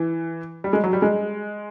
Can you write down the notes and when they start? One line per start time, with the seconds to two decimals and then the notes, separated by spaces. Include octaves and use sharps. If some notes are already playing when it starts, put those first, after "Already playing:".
Already playing: E3
0.64 G3
0.73 G#3
0.84 F#3
0.93 G3
1.02 G#3